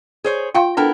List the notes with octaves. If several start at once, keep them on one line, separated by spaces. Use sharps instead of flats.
G#4 C5 C#5
F4 F5 G5 C6
B3 D4 E4 A4 A#4 G5